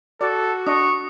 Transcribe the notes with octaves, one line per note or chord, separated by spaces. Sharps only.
F#4 A4 D5
D4 D#5 C#6 D#6